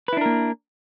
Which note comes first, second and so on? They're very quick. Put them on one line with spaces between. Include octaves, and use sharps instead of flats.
B4 E4 D4 A#4 A#3